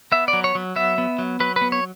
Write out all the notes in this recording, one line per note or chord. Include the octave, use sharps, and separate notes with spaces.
B3 E5
D5
F#3
C#5
F#3
B3 E5
B3
F#3
F#3 B4
B4
B3
C#5